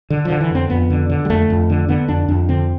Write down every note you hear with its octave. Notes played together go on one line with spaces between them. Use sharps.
D3
F3
D3
E3
F2 C4
F2 B3
D3
D3
G3
F2 A3
F2
D3
D3 B3
F2 D4
F2 D4
D3 C4